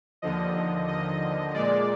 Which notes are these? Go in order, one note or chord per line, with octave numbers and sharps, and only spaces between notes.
D#2 D3 F3 D#5
D#5
A#2 G#3 D5